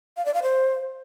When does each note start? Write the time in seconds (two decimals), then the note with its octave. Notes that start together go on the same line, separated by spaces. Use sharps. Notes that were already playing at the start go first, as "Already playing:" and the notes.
0.17 F5
0.25 D5
0.34 F5
0.43 C5